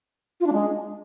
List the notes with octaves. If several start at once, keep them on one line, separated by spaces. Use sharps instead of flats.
F4
D4
G#3